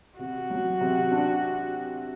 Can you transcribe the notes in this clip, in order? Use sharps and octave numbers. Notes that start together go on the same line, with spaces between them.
C3 F#4
F#3
C3
D4